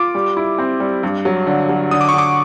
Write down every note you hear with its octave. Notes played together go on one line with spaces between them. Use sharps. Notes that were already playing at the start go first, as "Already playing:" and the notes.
Already playing: F4 D6
G3
E4
C4
G3
G2
F#3
D3
F#3
D3 D#6
D6
C#6
D3 D6